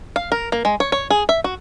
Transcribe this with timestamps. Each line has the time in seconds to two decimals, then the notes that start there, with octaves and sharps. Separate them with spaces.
0.16 F5
0.32 A#4
0.52 A#3
0.65 G#3
0.80 C#5
0.92 C#5
1.10 G#4
1.29 E5
1.44 F#4